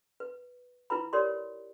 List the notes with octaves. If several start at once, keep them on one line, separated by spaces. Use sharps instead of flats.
B4
E4 F4 B4 A#5 B5
G4 A#4 C#5 D5 C6